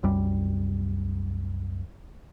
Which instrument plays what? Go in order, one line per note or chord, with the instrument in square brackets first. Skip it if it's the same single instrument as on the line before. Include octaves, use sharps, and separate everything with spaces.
[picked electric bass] C2 F#2 G3